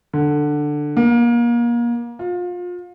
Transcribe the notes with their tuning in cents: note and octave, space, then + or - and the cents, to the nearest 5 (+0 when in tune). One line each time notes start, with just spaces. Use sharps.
D3 +10
A#3 +30
F4 +30